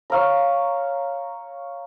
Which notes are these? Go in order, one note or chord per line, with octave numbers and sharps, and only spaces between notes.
C#5 F5 A#5